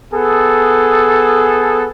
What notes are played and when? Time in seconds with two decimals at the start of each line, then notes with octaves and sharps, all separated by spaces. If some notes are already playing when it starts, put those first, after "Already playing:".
0.13 B3 G#4 A4